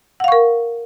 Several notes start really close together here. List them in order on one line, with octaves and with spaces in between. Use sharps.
F#5 F5 C#6 A#4